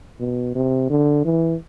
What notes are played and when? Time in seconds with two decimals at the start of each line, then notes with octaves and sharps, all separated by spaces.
0.20 B2
0.55 C3
0.90 D3
1.25 E3